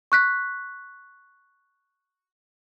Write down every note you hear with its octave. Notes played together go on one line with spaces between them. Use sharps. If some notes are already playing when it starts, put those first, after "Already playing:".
C#6 F#6 B6